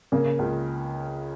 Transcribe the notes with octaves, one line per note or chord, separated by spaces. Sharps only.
C#3 A#3
C#2